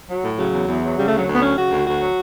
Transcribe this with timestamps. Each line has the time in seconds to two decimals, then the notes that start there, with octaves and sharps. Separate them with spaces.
0.08 F#3
0.23 A2
0.37 C#3 F#3
0.52 E2
0.67 E2
0.83 F#3
0.97 C#3 G3
1.06 A3
1.11 D2
1.17 F#3
1.27 D2
1.33 B3
1.41 F#3 C#4
1.56 C#3 F#4
1.71 D2
1.86 D2 F#4
2.01 F#3